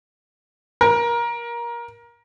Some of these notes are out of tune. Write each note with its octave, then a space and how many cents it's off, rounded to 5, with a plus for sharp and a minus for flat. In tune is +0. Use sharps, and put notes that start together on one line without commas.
A#4 +20